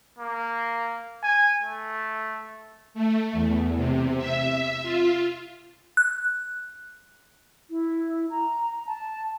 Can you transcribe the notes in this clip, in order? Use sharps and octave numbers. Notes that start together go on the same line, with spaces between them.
A#3
G#5
A3
A3
E2
C3
E5
F4
F#6
E4
A#5
A5